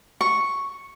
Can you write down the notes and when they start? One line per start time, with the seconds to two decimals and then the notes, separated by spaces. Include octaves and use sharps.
0.21 C#6